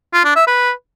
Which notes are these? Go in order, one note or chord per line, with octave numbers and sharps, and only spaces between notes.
F4
D4
E5
B4